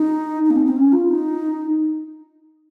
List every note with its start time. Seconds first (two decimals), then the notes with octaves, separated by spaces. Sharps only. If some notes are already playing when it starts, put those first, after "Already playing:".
Already playing: D#4
0.45 D#4
0.50 A#3
0.55 C4
0.66 C4
0.76 C#4
0.92 F4
1.09 D#4